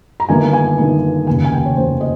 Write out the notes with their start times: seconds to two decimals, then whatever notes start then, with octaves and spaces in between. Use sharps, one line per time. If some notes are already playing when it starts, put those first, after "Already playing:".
0.20 A#5
0.29 G1 G2 D#3 A#3 D#4 G#5
0.53 G#5
0.78 G1 G2 D#3 A#3 D#4
1.27 F1 D#2 C#3 G#5
1.45 G#5
1.52 G5
1.66 C#5
1.76 F1 D#2 C#3 C5
2.01 D#5